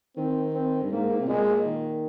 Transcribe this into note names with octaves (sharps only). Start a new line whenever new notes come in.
D#3 C4
C4
G2
G#2 A#3
G#2
C3
A#2 G#3
D#3